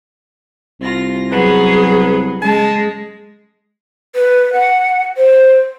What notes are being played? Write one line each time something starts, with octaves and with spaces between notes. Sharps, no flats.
C2 F4 A#6
F#3 B3 G#4 B4
C#3 G#3 A5
B4
F#5
C5